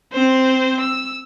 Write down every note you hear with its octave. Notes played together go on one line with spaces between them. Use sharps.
C4 C5
E6